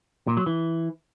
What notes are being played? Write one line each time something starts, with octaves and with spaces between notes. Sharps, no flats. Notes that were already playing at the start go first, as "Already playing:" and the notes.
A#2
F#3
E3